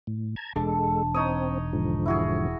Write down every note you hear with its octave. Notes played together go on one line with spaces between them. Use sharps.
A2
A5 A#5 G#6
E1 G#3 D4 A4 A5
C4 D#4 C#5 D#6
G#2 D3 F3
E4 F#4 G#4